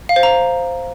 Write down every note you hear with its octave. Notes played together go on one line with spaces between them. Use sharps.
F5
C5
A#5